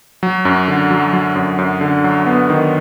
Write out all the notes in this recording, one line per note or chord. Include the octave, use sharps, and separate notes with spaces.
F#3
F#2
D3
F#3
F#3
F#2
F#2
D3
F#3
B3
D#3